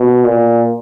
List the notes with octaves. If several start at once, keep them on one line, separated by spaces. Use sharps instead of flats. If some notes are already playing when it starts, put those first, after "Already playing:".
Already playing: B2
A#2